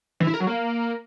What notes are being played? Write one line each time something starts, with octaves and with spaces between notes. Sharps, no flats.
E3
E4
A#4
F#3
A#3